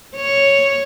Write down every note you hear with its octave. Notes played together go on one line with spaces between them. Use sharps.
C#5